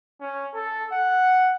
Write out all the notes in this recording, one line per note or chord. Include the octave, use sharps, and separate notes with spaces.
C#4
A4
F#5